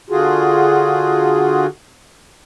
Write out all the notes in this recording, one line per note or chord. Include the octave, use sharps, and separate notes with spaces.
D3 F4 F#4 G#4